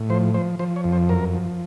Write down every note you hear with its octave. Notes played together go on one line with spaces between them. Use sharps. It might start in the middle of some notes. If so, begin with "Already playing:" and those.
Already playing: A2
F3 C5
F3 C5
F3 C5
C#5
F2
C5
F#2 A#4
F3